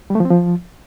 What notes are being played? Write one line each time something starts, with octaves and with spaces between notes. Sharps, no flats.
G3
A3
F3
C4
F3